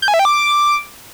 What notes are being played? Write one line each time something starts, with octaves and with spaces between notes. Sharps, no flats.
G6
G#5
E5
G5
D6